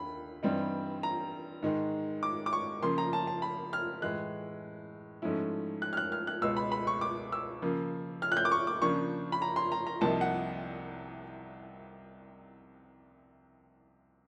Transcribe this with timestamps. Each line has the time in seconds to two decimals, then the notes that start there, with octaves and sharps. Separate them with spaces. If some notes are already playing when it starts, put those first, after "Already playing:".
Already playing: D#2 D3 B5
0.43 G2 E3 G3 C4 D#4
1.03 A#5
1.63 G#2 D#3 G#3
2.23 D6
2.46 D6
2.53 C#6
2.82 C#3 F3 A#3 C6
2.98 A#5
3.13 A5
3.27 A5
3.42 B5
3.73 F6
4.02 A2 E3 G#3 F#6
5.22 G#2 F3 A3 C#4 E4
5.82 F#6
5.93 F6
5.97 F#6
6.12 F6
6.27 F#6
6.42 C#2 B2 G#3 E6
6.57 B5
6.72 B5
6.87 C#6
7.01 D6
7.32 E6
7.62 C#3 F3 A#3
8.22 F6
8.32 F#6
8.37 G6
8.45 D6
8.52 C#6
8.67 D6
8.82 C#3 F3 A#3 D4 C#6
9.32 B5
9.42 A#5
9.56 C6
9.72 A#5
9.87 A#5
10.01 C2 C3 F3 A#3 D#4 A5
10.21 F#5